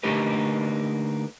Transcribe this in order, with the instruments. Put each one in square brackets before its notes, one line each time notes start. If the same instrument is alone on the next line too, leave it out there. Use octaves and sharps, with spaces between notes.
[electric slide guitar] D3 A3 A#3 D#4 G4 B4